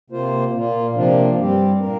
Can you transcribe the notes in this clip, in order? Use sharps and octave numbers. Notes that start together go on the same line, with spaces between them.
C3 A#3 F4 C5
A#2 A#3 F4
C3 F3 A#3 D4
G2 G3 C4 G4
A#2 A#3 D4 A#4